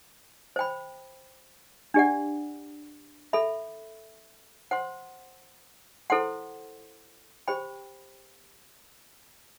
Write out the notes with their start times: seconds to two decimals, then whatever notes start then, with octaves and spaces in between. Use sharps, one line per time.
0.56 C5 G5 B5
1.94 D4 G4 D5 F#5
3.33 A4 E5 B5
4.71 C5 F#5 C6
6.10 E4 A4 C5 F#5 C6
7.48 G4 C5 G5 B5